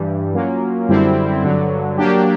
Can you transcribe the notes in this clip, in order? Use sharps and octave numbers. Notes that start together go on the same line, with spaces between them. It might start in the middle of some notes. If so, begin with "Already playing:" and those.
Already playing: G2 E3 G3
F#3 A#3 C#4 F4
F#2 D3 G3 C4 E4
G2 D3 F#3
F#3 A#3 D4 G4